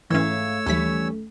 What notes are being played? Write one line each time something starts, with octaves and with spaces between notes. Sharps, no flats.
G#2 E3 A3 C#4 C#5 E5 F5 E6
D#2 E3 G3 C#4 B6